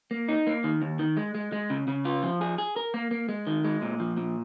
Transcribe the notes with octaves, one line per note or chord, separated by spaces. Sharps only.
A#3
D#4
A#3
D#3
D#2
D#3
G#3
G#3
G#3
C#3
C#3
F4
F3
G#4
G#4
A#4
A#3
A#3
G#3
D#3
G#3
A#2
F3
A#2